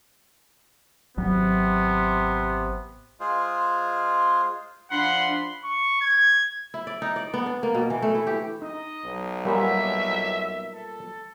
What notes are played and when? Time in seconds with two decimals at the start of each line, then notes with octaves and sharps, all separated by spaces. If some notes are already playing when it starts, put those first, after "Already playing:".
1.17 G#1 C3 F#3 B3
3.20 G#3 F4 G#4 C5
4.91 F3 D4 F#5 B5 C6
5.64 C#6
6.01 G#6
6.74 E4
6.87 D5
7.02 D#4
7.16 D5
7.34 B3
7.46 D4
7.63 A#3
7.74 B2
7.90 E3
8.02 A3
8.15 E4
8.27 G4
8.62 D#4 D#5
9.04 B1
9.45 A#2 G3 B3 C#4 A#4 C#5 E5
10.73 A4